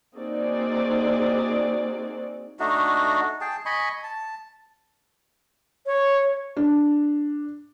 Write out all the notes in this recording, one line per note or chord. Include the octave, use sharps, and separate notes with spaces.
A#3 C4 D#4 F#4 G#4 D5
A3 D4 D#4 F#4
G#4 G5 A5
D#5 G#5 B5 C#6
A5
C#5
D4